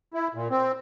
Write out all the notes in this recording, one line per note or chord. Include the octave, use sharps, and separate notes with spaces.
E4
A#2
C4